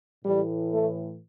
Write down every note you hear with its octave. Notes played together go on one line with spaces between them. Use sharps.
A2 E3 G3
A3